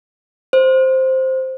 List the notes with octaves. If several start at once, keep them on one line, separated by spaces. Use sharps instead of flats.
C5